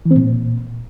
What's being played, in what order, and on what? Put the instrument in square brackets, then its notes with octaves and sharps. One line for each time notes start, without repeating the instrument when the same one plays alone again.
[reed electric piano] E3
C4
A#2